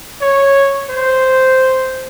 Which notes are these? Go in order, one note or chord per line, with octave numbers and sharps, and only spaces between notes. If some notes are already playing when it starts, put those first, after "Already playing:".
C#5
C5